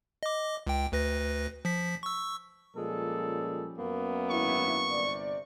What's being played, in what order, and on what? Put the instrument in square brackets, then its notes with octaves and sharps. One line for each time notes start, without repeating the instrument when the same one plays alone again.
[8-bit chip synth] D#5 D6
C#2 G5
D2 B4 A#6
F3 B6
C#6 E6
[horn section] A#2 G#3 A4 [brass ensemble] F3 G3 C#4
[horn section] F#2 A#3 B3
[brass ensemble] G#1 D4 E4 [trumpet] C#6
[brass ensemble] G1 C3 D5